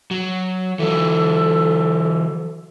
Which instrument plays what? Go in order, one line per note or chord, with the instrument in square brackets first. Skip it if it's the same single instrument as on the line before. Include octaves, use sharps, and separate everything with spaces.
[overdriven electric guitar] F#3
[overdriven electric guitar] E3 F#3 [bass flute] A4